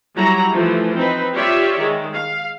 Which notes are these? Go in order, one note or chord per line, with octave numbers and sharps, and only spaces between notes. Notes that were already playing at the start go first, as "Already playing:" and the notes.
F#3 G3 E4 F#4 A#5
E3 F3 A3
C4 D#4 B4
F4 G4 C#5 D5 E5
D#3 G#3
F5